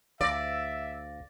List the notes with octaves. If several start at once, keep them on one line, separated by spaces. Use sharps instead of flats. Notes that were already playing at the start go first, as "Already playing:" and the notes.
D2 D5 E5 F5 A#6